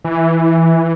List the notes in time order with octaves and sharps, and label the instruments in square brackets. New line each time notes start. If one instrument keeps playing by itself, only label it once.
[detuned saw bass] E3